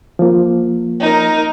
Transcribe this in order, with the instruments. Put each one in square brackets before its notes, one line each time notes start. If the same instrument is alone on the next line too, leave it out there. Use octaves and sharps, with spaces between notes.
[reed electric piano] F3 A#3
[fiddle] D#4 A#4